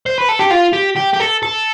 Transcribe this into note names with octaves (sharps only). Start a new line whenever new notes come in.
C5
B4
A4
G4
F4
G4
G4
G4
A4
A4